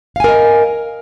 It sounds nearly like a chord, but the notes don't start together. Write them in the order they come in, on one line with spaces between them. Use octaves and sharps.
F5 G#5 A#4 D#5